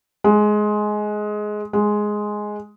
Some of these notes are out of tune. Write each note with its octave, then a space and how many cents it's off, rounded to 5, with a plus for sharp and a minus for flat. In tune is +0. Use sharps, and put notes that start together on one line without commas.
G#3 +15
G#3 +5